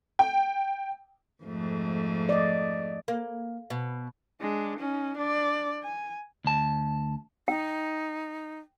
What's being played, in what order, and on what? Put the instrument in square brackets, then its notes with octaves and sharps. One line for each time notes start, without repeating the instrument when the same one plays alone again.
[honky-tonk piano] G5
[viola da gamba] F2 G#2 A3
[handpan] D5 D#5
[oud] A#3
B2
[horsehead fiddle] G#3 D4
C#4 D#4
D4 D5
G#5
[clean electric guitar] D2 A5
[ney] D#4 [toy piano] G5